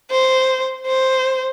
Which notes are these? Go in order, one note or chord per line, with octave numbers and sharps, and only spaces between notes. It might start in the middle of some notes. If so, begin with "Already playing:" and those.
C5
C5